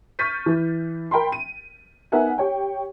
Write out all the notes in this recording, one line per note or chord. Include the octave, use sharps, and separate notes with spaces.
C#6 F6 G6 A6 B6 D#7
E3
A#4 G5 B5 C6
D#7
B3 D#4 A#4 E5 F#5 G#5
G4 C#5 G5